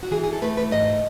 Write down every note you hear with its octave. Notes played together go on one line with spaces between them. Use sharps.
F#4
E3 G#4
G#4
A4
A3 B4
B4
G#2 D#5